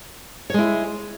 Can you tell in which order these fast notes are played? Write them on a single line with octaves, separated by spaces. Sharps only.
C#5 G#3 E4